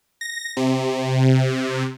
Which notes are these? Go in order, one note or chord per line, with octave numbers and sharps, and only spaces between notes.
A#6
C3